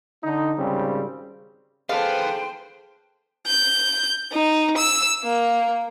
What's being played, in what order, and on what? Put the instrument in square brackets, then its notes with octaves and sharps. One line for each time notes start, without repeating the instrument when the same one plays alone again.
[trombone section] D3 D#4
G#1 C#3 G3 C4
[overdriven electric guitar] B3 [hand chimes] G#4 A4 A5 [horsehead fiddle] C5 G5 [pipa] F5
[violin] G6
D#4
E6
A#3